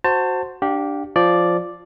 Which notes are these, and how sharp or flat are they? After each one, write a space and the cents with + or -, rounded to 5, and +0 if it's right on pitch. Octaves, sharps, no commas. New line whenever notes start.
F#4 +0 C5 +0 A5 +25
D4 +0 G4 -10 F5 +30
F3 +0 D5 +0